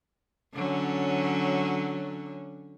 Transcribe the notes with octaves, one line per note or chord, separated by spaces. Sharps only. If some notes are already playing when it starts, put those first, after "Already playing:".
D3 F#3 C#4